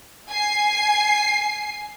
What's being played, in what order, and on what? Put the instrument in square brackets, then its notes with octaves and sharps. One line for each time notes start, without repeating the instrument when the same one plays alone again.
[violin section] G#5 C7